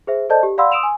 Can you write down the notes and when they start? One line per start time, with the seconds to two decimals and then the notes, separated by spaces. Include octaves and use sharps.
0.07 G#4 C5 E5
0.29 A4 C5 D5 D#5 A5 G6
0.43 G4
0.58 D5 F5 F#5 B5 C6 E6
0.72 C6 D#6 E6 D7 E7 F7
0.83 G#5